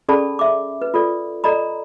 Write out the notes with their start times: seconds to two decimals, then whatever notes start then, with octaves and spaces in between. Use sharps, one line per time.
0.08 C#4 G#4 A4 D5 A5 B5
0.39 E5 D6
0.82 B4
0.94 F4 A4 D5
1.44 A4 D5 D#5 A#5 B5